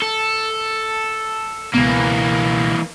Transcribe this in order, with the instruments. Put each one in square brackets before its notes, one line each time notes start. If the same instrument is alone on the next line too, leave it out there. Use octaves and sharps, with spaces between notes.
[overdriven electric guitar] A4
[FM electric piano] C#2 B2 [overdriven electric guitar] E3 A#3